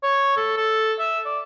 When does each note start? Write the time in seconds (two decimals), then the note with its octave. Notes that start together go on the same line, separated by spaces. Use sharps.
0.03 C#5
0.37 A4
0.57 A4
1.00 E5
1.25 D5